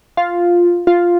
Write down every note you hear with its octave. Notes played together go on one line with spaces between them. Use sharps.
F4
F4